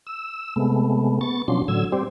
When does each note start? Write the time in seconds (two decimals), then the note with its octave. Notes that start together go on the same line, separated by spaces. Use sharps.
0.07 E6
0.56 C3 G#3 A3 B3
1.21 B3 C#6 A6
1.48 B2 F3 F#3 C#4 D4 C6
1.68 A2 D3 F#3 E6 G#6
1.92 G3 C4 G4 C5 D5